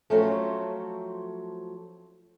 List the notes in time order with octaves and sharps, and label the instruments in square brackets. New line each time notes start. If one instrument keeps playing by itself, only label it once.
[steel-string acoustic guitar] F3 F#3 A3 C4 C#4